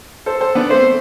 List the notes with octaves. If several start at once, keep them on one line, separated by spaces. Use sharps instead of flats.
A4 C5
A4 C5
B3 D4
A3 C4 C5